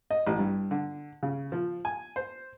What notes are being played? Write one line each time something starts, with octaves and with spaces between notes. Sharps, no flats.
D#5
A1
G2
D3
C#3
F3
G#5
C5